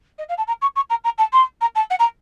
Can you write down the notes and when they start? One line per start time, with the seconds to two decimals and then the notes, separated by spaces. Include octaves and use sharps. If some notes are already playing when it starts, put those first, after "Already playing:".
0.18 D#5
0.28 F5
0.37 A5
0.47 A#5
0.61 C#6
0.75 C#6
0.89 A#5
1.04 A#5
1.18 A5
1.32 C6
1.61 A#5
1.75 A5
1.90 F#5
1.99 A#5